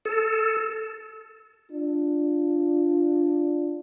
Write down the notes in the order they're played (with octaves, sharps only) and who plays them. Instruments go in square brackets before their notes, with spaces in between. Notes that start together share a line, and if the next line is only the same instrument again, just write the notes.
[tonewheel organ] A4
[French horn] D4 [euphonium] F4